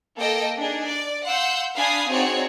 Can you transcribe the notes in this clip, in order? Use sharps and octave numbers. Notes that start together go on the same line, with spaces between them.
A#3 A4 D#5 G5
D4 D#4 G#4
D5
F5 F#5 C6 E6 G6
D4 F5 G#5 B5 D#6 C7
C4 D#4 F#4 G#4 C#5 D5